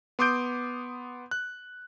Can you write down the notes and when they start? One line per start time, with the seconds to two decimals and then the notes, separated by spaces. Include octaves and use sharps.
0.19 B3 C6 D6 D#6 G6 D7
1.31 F#6